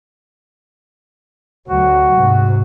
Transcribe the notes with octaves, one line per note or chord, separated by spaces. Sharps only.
D2 F#3 F#4
G#2 C3